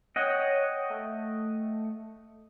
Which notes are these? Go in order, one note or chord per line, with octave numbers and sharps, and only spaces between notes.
C#5 D#5 F#5 G5
A3